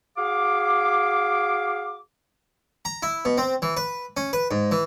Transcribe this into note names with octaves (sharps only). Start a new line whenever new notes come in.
F#4 G#4 F5 D6
A#5
E4
B2
C4
E3
B4
C#4
B4
G#2
E3